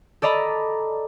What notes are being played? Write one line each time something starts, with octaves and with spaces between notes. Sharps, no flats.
A4 D5 D#5 A#5 B5